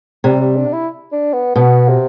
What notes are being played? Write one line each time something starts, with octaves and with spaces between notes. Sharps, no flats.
C3 G3
G3
D4
E4
D4
B3
B2 B3
C3